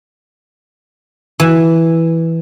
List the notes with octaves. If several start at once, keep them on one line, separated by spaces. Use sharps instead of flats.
E3